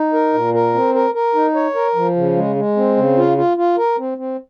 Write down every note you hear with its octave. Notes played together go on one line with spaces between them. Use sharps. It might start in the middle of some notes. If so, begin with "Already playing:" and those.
Already playing: D#4
A#4
A#2
A#4
C4
A#4
A#4
D#4
C#5
A#4
F3
C#3
G#3
G#3
C4
C#3
F4
F4
F4
A#4
C4
C4